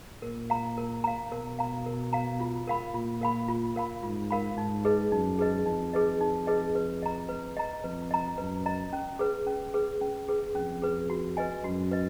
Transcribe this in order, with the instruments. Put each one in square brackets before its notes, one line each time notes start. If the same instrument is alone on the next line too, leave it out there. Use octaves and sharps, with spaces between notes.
[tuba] A#2 [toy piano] A#4
[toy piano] F5 A#5
A#4
F5 A#5
[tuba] B2 [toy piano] A#4
[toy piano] F5 A#5
A#4
F5 A#5
F4
A#4 F5 B5
[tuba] A#2 [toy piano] F4
[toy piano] A#4 F5 B5
F4
A#4 F5 B5
[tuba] G#2 [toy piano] F4
[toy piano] A#4 F5 B5
[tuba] G#2 [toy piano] D#4
[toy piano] G#4 B4 D#5
[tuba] F#2 [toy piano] D#4
[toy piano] G#4 B4 D#5
[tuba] F2 [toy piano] D#4
[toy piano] G#4 B4 D#5
D#4
G#4 B4 D#5
B4
D#5 A#5
B4
D#5 A#5
[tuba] F2 [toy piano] B4
[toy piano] D#5 A#5
[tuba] F#2 [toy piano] B4
[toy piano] D#5 A#5
C#4
G#4 B4
C#4
G#4 B4
C#4
G#4 B4
[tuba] F2 [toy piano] C#4
[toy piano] G#4 B4
F#4
B4 D#5 G#5
[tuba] F#2 [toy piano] F#4
[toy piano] B4 D#5